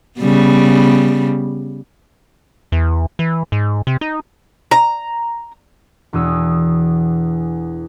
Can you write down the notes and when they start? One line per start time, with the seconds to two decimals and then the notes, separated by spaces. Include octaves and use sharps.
0.19 C#3 G3 B3
2.72 E2
3.19 E3
3.52 G#2
3.87 C3
4.01 D#4
4.71 A#5
6.13 E1 E2 D#6 E6 C#7